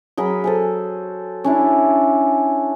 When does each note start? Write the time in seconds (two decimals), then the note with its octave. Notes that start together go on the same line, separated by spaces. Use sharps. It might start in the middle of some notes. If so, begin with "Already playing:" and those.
0.17 F#3 G#4 A#4 B5
0.44 A4 C5 G#5
1.44 C#4 D4 E4